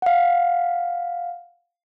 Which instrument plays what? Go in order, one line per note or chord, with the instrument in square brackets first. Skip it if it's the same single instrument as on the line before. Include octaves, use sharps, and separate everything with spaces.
[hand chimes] F5 F#5